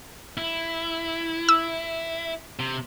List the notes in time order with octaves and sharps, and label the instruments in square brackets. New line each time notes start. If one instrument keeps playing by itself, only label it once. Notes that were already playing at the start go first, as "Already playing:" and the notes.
[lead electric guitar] E4
[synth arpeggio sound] E6
[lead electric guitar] C3